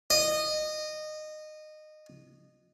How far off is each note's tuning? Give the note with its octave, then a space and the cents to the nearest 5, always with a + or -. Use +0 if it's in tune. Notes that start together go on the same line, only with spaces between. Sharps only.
D#5 -20